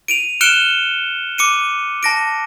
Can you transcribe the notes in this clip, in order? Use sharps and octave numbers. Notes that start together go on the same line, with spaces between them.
D7 D#7 F7
F6 F#6 C#7 D7 E7 G7
D6 C#7 D#7
A5 A#6 D7